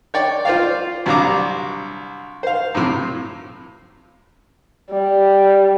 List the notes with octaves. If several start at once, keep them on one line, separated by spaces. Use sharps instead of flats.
C#5 D5 G5
F4 C5 D5 F5
C2 F#3 D4 F5 A#5 D6
C5 F5
A2 C3
G3